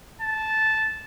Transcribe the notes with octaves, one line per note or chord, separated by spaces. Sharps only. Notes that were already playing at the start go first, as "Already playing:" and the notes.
A5